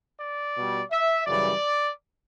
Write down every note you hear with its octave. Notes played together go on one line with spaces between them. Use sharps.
D5
B2 G3
E5
F#2 C#3 E3 G3 D5